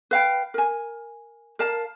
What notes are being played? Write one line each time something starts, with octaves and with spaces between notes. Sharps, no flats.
B4 F5 G5
A#4 G#5
A#4 F5 A5